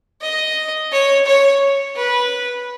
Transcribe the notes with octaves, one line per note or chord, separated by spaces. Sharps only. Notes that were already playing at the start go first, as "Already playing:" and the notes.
D#5
C#5
C#5
B4